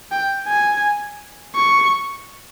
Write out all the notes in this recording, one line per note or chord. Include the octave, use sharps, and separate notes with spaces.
G5
G#5
C#6